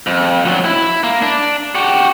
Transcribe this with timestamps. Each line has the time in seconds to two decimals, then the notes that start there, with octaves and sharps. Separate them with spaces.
0.07 F2
0.45 D2 F#3
0.65 E4
1.04 A#3
1.22 D4
1.75 F#4 G4